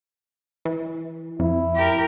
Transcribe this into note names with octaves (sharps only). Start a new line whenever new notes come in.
E3
F2 E4
G4 A#4